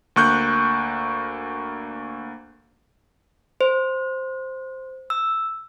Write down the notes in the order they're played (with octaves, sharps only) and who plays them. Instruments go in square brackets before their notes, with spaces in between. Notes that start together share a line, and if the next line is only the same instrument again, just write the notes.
[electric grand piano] D2 A#3 C#6 F#6 G6
[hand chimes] C5
E6